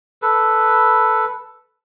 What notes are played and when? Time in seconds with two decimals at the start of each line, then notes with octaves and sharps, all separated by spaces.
0.22 A4 B4